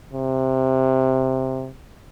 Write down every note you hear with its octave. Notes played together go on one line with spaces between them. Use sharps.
C3